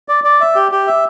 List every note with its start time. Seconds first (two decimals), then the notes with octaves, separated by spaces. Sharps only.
0.08 D5
0.24 D5
0.40 E5
0.55 G4
0.72 G4
0.87 E5